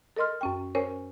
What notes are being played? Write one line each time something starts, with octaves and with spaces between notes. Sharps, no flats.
A4 A#4 D#5 C6 F6
F#2 C#4 G5
C#4 A#4 C5 C#5 G#5